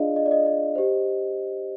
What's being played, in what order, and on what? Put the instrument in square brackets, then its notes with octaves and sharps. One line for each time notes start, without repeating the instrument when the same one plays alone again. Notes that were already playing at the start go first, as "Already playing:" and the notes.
Already playing: [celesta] D4 F4 G#4 D5 D#5 F5
D#5
D5
D#5
D#5
G4 C5